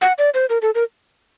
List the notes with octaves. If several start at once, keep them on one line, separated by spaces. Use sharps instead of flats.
F#5
D5
C5
A#4
A4
A#4